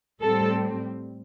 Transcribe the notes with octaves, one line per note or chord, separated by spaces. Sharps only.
A2 G3 C4 A4